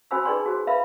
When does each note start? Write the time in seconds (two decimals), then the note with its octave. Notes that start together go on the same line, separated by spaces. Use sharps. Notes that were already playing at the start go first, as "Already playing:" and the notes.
0.11 C#4 F#4 C5 G#5 B5 E6
0.25 D#4 G#4 B4 D5 G5 C6
0.46 F#4 G#4 C5
0.67 A#4 B4 E5 F5 B5